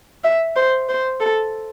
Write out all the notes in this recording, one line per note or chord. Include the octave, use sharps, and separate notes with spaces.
E5
C5
C5
A4